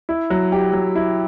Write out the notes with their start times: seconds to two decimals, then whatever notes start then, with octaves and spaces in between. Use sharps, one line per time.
0.09 E4
0.30 F#3
0.52 G4
0.73 F#3
0.96 E4